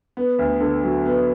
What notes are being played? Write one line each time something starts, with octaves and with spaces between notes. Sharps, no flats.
B3
D2
D3
F#3
B3